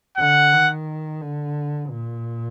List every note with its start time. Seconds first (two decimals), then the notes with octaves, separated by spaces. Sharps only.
0.18 D3 F#5
0.53 D#3
1.21 D3
1.90 A#2